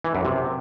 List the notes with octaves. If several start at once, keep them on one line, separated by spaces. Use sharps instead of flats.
E3
F#2
C3